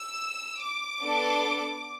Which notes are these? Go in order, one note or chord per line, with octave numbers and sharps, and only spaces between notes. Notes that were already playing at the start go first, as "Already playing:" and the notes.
Already playing: E6
D6
B3 D4 A4